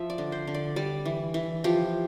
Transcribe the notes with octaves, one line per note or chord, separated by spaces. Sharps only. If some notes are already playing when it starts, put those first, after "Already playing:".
Already playing: F3 E5
D5
D3
C5
D3
D5
G3 D5
E3
E3
F3 G4